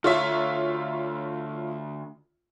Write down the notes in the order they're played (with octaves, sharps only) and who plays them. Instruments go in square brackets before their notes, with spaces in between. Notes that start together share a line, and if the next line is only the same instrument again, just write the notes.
[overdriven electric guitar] D2 [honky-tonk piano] F4 C#5 E5